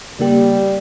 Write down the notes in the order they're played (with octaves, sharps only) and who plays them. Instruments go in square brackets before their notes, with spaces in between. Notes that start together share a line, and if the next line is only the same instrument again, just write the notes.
[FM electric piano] C#3 A#3 G4 [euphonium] G3